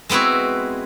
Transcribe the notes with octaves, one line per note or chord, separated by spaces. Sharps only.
G#3 B3 C4 E4 F#4